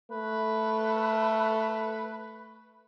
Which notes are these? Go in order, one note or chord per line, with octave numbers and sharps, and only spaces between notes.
A3 B4